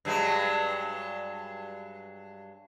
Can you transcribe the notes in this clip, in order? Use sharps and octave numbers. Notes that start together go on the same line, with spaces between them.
G2 F#3 G#3